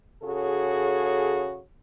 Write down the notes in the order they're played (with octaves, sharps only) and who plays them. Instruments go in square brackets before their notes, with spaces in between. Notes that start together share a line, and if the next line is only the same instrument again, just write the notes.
[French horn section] C#3 F#4 G#4 A4 C#5